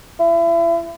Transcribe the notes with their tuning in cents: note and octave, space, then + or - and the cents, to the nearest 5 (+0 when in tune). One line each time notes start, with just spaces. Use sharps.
E4 +35